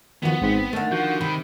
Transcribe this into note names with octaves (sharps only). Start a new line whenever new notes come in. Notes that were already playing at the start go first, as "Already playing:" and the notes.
E2 D#3 F3 B3 F#4
G#1 G#2 C4 B6
D3 D#3 A3 A6
F3 F#4 G6
C3 D#3 B5